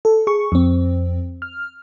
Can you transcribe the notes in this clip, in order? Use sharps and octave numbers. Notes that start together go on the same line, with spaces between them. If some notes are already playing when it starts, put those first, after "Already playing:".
A4
G#4 C#6
F2 C4
F6